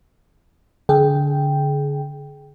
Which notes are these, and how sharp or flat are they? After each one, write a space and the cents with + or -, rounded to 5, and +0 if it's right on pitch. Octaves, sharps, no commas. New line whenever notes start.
D3 -25 G#4 +25 G5 +0